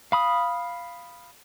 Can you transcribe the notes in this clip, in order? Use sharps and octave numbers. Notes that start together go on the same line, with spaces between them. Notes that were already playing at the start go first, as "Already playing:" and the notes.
F5 B5 D#6